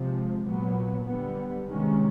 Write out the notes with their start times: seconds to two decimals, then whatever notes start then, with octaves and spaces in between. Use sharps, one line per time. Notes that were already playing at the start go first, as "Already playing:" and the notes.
Already playing: C3 F3 G#3
0.45 A#2 F#3 B3
1.05 D3 G3 B3
1.67 C3 D#3 G#3 C#4